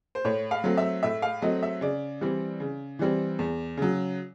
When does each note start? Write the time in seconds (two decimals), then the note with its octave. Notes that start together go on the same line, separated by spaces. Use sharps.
0.15 C5
0.25 A2 C#5
0.51 F5
0.64 F#3 A3 C4
0.77 E5
1.03 A2 E5
1.22 F5
1.42 F#3 A3 C4 D#5
1.63 E5
1.81 C#3 D5
2.21 E3 G3 C4
2.60 C#3
2.99 E3 G3 C4
3.39 E2
3.77 C#3 F#3